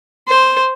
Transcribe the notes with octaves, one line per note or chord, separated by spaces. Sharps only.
C5